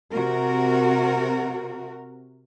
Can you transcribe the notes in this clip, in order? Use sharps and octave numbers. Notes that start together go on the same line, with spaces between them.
C3 F#4 A#4